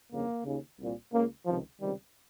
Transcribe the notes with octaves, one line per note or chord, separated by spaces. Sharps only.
G1 F2 C#3 A#3
D#2 C#3
C2 A#2
C#2 C#3 A#3
C#2 C3 D#3 F3
C#2 C3 D#3 G3